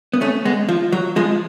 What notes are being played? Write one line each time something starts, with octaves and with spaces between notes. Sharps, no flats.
B3
A3 C#4
G#3 B3
F3
F#3
F3 G#3